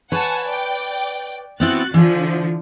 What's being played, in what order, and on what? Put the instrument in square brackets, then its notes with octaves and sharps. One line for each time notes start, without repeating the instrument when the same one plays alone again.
[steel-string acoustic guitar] B4 C#5 [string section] F#5 G#5 A5
[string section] D5 G5
[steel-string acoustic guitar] B3 C4 E4 [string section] F#4 F#6 A6
[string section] D3 F3 [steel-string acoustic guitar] E3